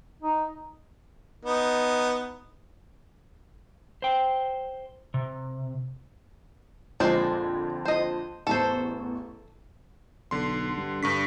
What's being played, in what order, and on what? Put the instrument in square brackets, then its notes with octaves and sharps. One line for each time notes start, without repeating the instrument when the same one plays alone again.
[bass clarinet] D#4
[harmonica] B3 D#4
[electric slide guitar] C5 G5
C3
[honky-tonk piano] F2 A#2 D3 [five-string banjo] G#3 C5 D5
[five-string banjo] C5 D#5
[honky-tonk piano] A1 E2 [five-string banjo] A4 C5
[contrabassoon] B1 [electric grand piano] D3 C6
[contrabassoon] G2
[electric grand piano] G2 C#6 B6 [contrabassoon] D3